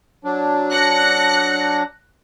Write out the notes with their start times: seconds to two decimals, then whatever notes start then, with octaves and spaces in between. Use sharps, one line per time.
0.24 F#3 D4
0.70 F#6 A#6 C#7